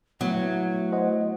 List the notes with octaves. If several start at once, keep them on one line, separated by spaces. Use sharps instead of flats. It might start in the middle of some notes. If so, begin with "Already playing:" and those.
F#3 A3 B3 E4 F#4
C5 D#5 F#5